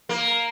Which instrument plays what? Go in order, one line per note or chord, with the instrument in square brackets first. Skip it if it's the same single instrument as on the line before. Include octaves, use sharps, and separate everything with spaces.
[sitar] A#3